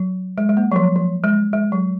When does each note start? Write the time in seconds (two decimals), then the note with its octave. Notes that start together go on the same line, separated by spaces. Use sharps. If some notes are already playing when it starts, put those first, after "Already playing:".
Already playing: F#3
0.38 G#3
0.49 G#3
0.57 A#3
0.72 F#3
0.76 F3
0.96 F3
1.24 G#3
1.53 G#3
1.72 F#3